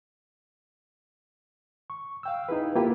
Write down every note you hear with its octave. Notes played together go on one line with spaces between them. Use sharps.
C#6
F5 G5 E6
D#4 E4 G#4 B4
A#3 E4 F4 G4 B4 G5